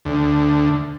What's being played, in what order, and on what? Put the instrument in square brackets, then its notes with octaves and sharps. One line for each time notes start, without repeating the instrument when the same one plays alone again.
[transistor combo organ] D2